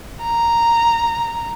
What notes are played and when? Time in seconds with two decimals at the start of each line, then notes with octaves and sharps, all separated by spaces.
0.23 A#5